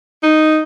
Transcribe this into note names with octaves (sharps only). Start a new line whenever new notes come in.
D#4